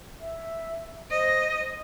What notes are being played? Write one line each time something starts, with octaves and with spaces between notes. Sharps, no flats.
E5
C5 D#5